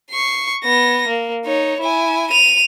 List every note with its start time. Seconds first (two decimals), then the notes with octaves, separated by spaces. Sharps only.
0.11 C#6 C7
0.64 B3 A#6
1.08 A#3
1.45 D#4 C#5
1.80 E4 G#5
2.31 D#7 F7